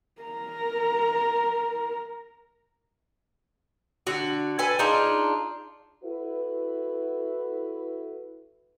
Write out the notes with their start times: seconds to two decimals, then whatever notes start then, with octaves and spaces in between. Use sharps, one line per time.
0.22 A#4 A#5
4.07 D3 F#4
4.59 A4 B4 G#5
4.79 D4 D#4 F4 G#4
6.04 E4 F#4 A4 B4